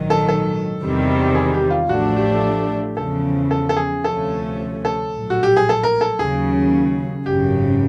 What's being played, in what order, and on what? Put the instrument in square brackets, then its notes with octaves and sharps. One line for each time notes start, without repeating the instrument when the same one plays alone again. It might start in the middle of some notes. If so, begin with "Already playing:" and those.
Already playing: [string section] A#1 G#2 D#3 F#3
[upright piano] A4
A4
[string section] E2 C3 D#3 G3 C4
[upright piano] G#4
G4
F4
[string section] A1 A2 F3 A3 D4 [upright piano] F#4
[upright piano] G4
[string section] E2 C#3 F3 [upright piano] A4
[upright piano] A4
A4
G#4
[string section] D2 C3 F3 A3 C#4 [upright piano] A4
[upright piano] A4
[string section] A#1 A2 F#3
[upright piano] F#4
G4
G#4
A4
A#4
A4
[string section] D#2 C#3 F#3 [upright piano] G#4
[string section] G#1 F#2 C#3 [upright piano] G4